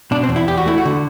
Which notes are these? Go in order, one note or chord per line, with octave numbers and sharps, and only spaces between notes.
B2 D4
C4
E2
E4
E2 G4
F#4
A3 E4
F#4
D3